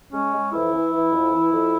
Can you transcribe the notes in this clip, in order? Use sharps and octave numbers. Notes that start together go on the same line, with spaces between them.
G#3 C#4
G#3
F2 E3 E4
E3
E3
F2
E3
F2